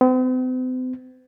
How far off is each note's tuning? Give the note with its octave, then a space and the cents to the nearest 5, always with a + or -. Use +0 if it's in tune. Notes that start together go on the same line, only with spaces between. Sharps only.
C4 -45